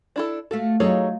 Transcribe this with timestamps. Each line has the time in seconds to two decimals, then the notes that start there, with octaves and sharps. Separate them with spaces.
0.16 D4 E4 A4
0.51 A3 F4 F#4 A4
0.80 F#3 D#4 F4 G#4 A4 C#5